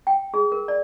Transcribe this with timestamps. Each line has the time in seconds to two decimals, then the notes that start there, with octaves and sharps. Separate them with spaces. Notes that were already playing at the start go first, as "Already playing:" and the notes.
0.07 G5
0.34 G#4
0.52 A#4
0.68 D5